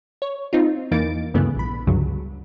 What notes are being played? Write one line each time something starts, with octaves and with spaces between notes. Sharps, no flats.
C#5
C4 D#4 F4
E2 E3 A#3 D#4 A6 D7
D2 G2 C#3 E3 A3 B3
A#1 B5
C#2 G2 D3 F#3